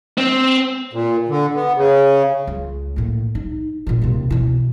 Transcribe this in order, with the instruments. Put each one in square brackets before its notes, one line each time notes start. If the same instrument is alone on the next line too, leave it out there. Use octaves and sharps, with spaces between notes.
[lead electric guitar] C4
[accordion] A#2
D3
B3
C#3
[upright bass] C#2
A2 A#3
D#4
A#2 D#3
D#2 C3
B2 E3